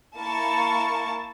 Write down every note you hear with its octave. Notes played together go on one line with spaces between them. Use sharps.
A#3 E4 A5 C#6